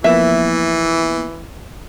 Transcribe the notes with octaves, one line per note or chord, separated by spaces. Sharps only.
E3 F3 A#3 B3 E5